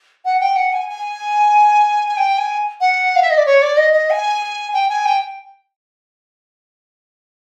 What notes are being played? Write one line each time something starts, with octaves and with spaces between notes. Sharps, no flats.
F#5
G5
F#5
G#5
G#5
G#5
G5
G#5
F#5
F5
E5
D#5
D5
C#5
D5
D#5
D#5
G#5
G5
G#5
G5